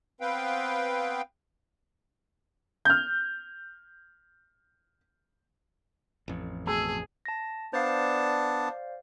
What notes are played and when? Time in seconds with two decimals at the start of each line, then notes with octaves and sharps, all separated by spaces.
0.21 B3 C4 B4 F5 G5
2.85 F6 G6
6.28 A1 F2
6.67 B2 A3 G#4 A4
7.25 A5 A#6
7.73 B3 D4 C5 D5 F5 A5